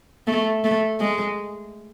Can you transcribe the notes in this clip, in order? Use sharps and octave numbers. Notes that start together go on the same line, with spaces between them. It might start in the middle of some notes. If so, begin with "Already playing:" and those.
A3
A3
G#3